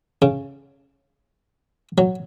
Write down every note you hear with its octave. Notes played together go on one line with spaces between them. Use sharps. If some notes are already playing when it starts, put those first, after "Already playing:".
C#3
F#3